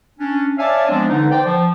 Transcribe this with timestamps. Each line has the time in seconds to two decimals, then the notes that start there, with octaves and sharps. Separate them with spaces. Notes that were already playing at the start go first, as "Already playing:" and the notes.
0.19 C#4 D4
0.59 C#5 D5 E5 F5 G#5 A5
0.88 F3 G#3 B3 C4 D4
1.09 D3 E3 D#4
1.31 C5 D5 G5
1.45 F3